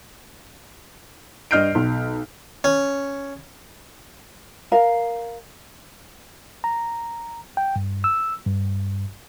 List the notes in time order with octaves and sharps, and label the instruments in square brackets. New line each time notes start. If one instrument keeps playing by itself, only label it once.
[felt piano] G2 D#5 F6 G6 C7 D7
B1
[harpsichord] C#4
[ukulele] A#4 F5
[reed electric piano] A#5
G5
G2
E6
G2